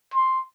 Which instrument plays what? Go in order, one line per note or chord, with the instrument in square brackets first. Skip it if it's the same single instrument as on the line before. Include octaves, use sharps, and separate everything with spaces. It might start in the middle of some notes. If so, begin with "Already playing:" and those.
[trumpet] C6